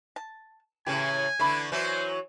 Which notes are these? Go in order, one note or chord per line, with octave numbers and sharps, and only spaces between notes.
A5
A2 C#3 E3 G4 G#5
D3 E3 A3 D4 D5 B5
E3 F#3 E4 C5